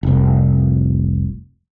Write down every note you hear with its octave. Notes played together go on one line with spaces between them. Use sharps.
F1 C2